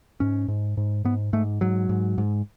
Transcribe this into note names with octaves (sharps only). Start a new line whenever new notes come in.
G#2 C#4
G#2
G#2
G#2 B3
G#2 A3
G#2 F#3
G#2
G#2